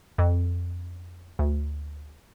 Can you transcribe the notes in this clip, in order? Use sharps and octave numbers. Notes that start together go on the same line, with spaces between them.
F2
D2